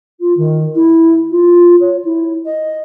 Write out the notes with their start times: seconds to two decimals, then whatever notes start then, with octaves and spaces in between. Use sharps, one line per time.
0.20 F4
0.37 D#3
0.74 E4
1.31 F4
1.80 C#5
2.04 E4
2.45 D#5